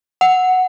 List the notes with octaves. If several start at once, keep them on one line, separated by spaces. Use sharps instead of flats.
F#5